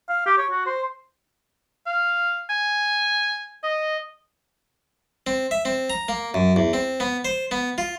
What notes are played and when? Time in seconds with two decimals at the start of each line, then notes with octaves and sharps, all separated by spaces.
0.09 F5
0.26 G4
0.38 C#5
0.51 F#4
0.66 C5
1.86 F5
2.50 G#5
3.63 D#5
5.27 C4
5.51 E5
5.65 C4
5.90 A#5
6.08 A#3
6.34 F#2
6.56 E2
6.73 C4
7.00 B3
7.25 C5
7.51 B3
7.78 F4